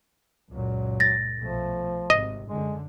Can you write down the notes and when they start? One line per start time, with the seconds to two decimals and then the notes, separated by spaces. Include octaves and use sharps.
0.50 C#2 F#2 A#2 F#3
1.00 A6 A#6
1.40 B1 B2 F3 A3
2.10 G#1 C3 D#5
2.49 F#2 D3 G#3